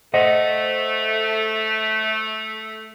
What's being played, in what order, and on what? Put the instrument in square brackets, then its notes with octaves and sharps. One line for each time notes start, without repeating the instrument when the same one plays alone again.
[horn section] A3 [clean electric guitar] C5 D#5 F#5